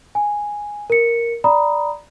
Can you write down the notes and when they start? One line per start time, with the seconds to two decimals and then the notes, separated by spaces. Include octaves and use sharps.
0.15 G#5
0.90 A#4 C#7
1.44 D5 A#5 B5 D#6